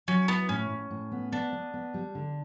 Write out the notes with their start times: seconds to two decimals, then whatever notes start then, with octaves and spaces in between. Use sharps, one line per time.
0.08 F#3 C#4
0.28 B3 E4
0.49 A2 C#4
0.70 A2
0.90 A2
1.12 B3
1.32 B3 D4
1.52 B3
1.74 B3
1.94 G3
2.15 D3